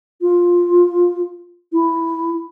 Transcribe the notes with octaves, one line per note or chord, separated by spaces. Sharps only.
F4
E4